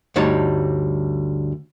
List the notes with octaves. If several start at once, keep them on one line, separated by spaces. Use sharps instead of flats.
D2 G2 G3 D#4 C#5 A5